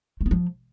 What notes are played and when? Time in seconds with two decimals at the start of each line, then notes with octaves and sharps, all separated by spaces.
0.21 A3
0.26 B3
0.31 F3